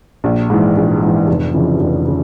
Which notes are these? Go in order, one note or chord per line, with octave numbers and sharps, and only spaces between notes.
A#1
G#2 E3
A#1
G#2 E3
F1
F2 C#3 E3
F1
C#3